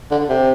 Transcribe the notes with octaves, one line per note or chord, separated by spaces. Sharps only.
D3
C3